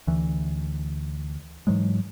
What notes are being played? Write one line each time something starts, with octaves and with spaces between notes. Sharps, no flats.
D2 E3
G#2 E3 F#3 G#3